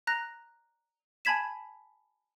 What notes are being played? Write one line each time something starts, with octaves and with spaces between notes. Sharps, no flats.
A#5 F#6 A#6
G#5 A5 B5 G#6 B6 E7